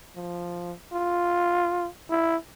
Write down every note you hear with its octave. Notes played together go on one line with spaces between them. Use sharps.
F3
F4
E4